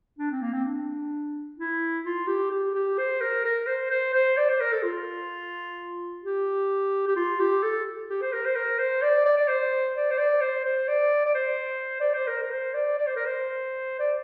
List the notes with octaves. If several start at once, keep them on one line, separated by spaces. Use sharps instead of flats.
D4
C4
A#3
C4
D4
E4
F4
G4
G4
G4
C5
A#4
A#4
C5
C5
C5
D5
C5
A#4
A4
F4
G4
G4
F4
G4
A4
G4
C5
A#4
C5
A#4
C5
D5
D5
D5
C5
D5
C5
D5
C5
C5
D5
D5
C5
D5
C5
A#4
A#4
C5
D5
D5
C5
A#4
C5
D5